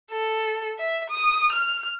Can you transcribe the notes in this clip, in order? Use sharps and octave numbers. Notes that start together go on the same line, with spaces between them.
A4
E5
D#6
F6